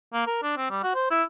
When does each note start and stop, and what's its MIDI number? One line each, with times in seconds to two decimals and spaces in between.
0.13 0.25 58
0.27 0.38 70
0.43 0.56 62
0.57 0.68 60
0.70 0.83 55
0.83 0.90 66
0.95 1.09 72
1.11 1.23 64